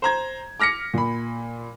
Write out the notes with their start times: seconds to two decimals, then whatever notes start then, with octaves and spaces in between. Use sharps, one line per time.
0.02 C5 A#5 G#6
0.60 D6 F6 A#6 B6 C#7
0.94 A#2 B5